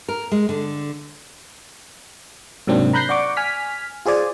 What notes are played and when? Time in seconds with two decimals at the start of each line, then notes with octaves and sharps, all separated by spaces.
0.08 A#4
0.32 G#3
0.49 D3
2.67 G#2 C3 F#3 A#3 C4 D4
2.93 A#5 B5 F#6 G6 A#6 C7
3.09 D5 F#5 C#6 D6
3.37 G#5 F6 B6
4.06 F4 G#4 C5 D5 G#5